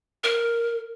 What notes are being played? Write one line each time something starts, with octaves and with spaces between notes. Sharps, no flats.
A#4